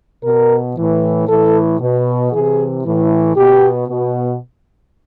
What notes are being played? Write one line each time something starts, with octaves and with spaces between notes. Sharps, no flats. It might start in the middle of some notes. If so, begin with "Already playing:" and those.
B2 A#4
A2 E3
A2 E3 A4
B2
C3 E3 G#4
A2 E3
B2 G4
B2